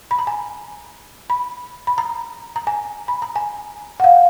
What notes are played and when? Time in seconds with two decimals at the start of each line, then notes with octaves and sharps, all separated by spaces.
0.11 B5
0.19 A#5
0.27 G#5
1.30 B5
1.87 B5
1.98 A#5
2.56 A#5
2.67 G#5
3.08 B5
3.22 A#5
3.36 G#5
4.00 F#5
4.04 F5